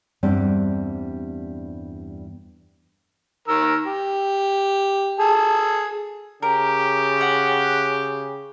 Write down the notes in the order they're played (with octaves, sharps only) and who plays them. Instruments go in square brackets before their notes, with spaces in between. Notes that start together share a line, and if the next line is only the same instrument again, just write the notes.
[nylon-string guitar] E2 G2 G3 C4 D4 D5
[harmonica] D#3 A#4 E6
G4
G#4 A4
[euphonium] C#3 [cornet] G4 [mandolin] A#4
[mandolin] F#5